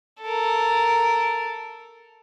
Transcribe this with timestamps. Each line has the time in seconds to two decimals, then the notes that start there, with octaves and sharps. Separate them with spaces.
0.22 A4 A#4